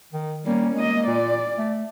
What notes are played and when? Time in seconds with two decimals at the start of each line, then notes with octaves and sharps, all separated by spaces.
0.13 D#3
0.46 G3 A#3 C#4
0.75 G#3 A#3 D#5
1.07 A#2 D5
1.58 A3